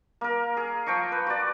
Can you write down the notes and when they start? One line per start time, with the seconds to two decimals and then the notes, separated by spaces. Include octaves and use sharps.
0.21 A#3 A#4
0.57 G#4
0.86 F3 G5 A#5 C#6
1.12 B4
1.27 F#4 D5